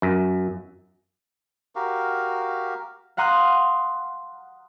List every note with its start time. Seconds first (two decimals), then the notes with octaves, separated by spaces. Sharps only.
0.02 F#2
1.75 F#4 G4 A#4 F5
3.17 F5 F#5 A#5 C6 D#6 F#6